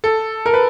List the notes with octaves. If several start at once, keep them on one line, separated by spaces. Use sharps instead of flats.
A4
A#4
B4